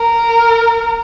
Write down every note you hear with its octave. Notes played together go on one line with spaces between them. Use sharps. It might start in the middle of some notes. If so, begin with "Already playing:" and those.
Already playing: A#4